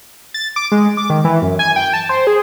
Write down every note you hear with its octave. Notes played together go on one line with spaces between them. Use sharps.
A6
D6
G#3
D6
D#3
E3
F#2
G#5
G5
A5
C5
G#4